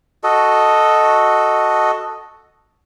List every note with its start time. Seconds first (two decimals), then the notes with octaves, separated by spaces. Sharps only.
0.24 F#4 A4 D#5